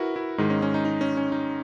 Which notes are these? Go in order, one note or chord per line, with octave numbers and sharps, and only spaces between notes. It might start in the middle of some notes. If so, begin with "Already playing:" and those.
Already playing: E4 F#4 A#4 B4
E4
G#2 D#3 G#3 D#4
C#4
C#4
D#4
D#4
C#4
C#4
D#4